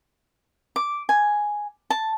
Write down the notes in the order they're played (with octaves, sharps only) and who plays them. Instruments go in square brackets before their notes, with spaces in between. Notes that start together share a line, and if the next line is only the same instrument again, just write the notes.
[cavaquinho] D6
G#5
A5